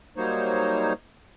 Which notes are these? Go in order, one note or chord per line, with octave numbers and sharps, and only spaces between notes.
F#3 G3 A#3 D#4 C5 C#5